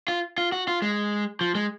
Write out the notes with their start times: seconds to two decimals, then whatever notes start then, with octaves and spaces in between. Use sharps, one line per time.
0.08 F4
0.38 F4
0.52 F#4
0.68 F4
0.82 G#3
1.41 F3
1.55 G#3